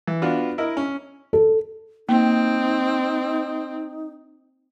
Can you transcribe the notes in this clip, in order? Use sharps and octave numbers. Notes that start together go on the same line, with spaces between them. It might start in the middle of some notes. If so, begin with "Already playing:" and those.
E3
B3 D4 F4 F#4
E4 A#4 D#5
C#4
A4
A#3 C4 D#4